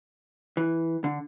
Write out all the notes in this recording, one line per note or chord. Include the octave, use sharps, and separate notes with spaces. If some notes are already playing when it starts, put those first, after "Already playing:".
E3
D3